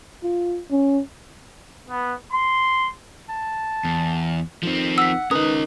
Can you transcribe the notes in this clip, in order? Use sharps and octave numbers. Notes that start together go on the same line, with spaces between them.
F4
C#4
B3
C6
A5
E2
D#3 F3 C4
F#5 E6 B6
D#3 C#4 A#4 B4 D#5 D#6